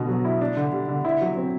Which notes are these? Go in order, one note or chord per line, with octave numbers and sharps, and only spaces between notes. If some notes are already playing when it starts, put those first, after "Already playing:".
Already playing: B2 D3 B3
F#3
E4
D4
D3
G3
D3
E4
F#3
C4